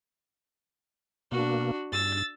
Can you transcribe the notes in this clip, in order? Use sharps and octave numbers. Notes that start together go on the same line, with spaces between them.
B2 A#3 D4 F#4
G2 E6 A6